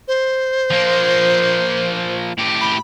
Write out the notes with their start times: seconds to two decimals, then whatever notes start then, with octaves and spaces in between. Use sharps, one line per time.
0.08 C5
0.71 F3 A#3
2.38 A2 G4
2.61 B5